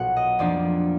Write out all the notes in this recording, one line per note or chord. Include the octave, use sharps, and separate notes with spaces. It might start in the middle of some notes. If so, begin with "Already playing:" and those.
Already playing: B1 A#2 F#3 F#5
D#5
F2 F3 A#3 D4 D5